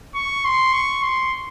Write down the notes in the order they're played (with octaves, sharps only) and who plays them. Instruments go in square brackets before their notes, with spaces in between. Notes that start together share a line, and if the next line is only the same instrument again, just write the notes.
[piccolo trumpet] C#6
C6
C#6
C6